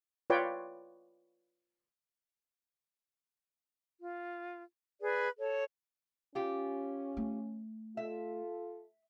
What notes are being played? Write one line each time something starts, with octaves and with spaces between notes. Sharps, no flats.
F4 B4 C#5 D5 G5
F4
G#4 B4 D5
A4 C#5
C#4 F4 G4
A3
F4 A4 E5